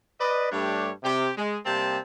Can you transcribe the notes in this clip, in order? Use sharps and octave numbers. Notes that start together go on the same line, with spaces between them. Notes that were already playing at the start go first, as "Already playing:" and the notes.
B4 D5 D#5
G2 G3 A3 D4 G4 C#5
C3 G4
G#3
C3 G3 A#3 C4 G5 A5